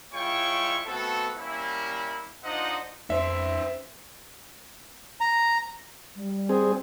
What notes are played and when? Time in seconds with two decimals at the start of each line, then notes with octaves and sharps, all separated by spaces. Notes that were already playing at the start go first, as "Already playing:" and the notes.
0.14 G#3 E4 F4 C#5 G5 C#6
0.86 A3 B3 C4 F#4 A4
1.37 G3 A#3 C#4 E4
2.43 D4 D#4 F4 C5 D#5 F#5
3.10 F2 C#4 C5 E5
5.21 A#5
6.15 G3
6.49 C4 G#4